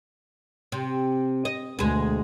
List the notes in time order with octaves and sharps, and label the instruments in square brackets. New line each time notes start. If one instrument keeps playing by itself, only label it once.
[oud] C3
D#5
[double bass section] D2 [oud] B2 G#3